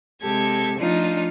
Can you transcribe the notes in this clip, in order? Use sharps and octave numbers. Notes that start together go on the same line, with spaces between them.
C3 G#3 G4 A4 G#6
F3 A3 D4 D#4 F4